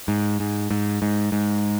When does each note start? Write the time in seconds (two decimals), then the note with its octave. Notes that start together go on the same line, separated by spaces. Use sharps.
0.08 G#2
0.40 G#2
0.71 G#2
1.02 G#2
1.32 G#2